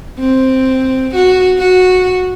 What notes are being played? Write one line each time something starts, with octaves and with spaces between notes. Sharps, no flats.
C4
F#4
F#4